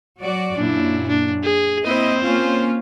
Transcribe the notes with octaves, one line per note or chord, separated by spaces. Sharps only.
F#3 F#4 D5
F#2 A#2 D4 E4
D4
G#4
A#3 C4 E4 C5 D#5
A#3 C#4 F4